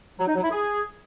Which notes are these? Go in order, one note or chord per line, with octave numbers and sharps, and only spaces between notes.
F#3
D#4
F#3
E4
G#4